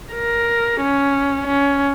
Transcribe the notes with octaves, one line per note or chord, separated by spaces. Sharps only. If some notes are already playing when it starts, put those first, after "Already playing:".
A#4
C#4
C#4